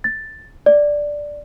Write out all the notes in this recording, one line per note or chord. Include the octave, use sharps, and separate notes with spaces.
A6
D5